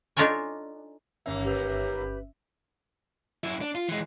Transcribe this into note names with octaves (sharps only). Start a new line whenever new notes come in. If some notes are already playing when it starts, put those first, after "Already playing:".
D4 D#4 F4 A4 C#5 G#5
G1 D#2 A#3 C#4 E5
G4 B4 B5
F#2 E4
D4
F4
E3 G#3